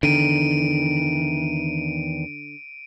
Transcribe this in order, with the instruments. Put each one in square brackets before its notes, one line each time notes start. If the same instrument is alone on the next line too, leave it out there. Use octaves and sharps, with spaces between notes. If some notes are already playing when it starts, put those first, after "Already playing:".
[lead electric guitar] E2 D#3 [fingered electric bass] D3 [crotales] D7 D#7